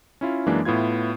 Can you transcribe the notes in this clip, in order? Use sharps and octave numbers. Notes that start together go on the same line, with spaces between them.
C#4 E4 F4
F#2 E3 G#3 A#3 D4
A2 B3 E4 F4 G#6